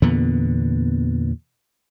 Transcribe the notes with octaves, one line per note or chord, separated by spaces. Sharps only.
E2 A#2 D3 B3